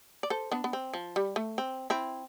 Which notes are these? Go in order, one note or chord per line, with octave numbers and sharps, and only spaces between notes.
D5
A4 C5
B3 D4
B3
C4
F3
G3
A3
C4
C4 E4